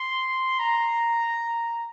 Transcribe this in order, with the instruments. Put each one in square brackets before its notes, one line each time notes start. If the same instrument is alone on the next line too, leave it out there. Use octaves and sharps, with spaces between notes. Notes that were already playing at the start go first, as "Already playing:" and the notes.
Already playing: [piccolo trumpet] C6
A#5